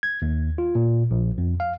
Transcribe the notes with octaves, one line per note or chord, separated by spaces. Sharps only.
G#6
D#2
F4
A#2
A#1
F2
F5